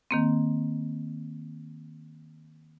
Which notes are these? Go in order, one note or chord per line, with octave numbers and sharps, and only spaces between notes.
D#3 A#3 C4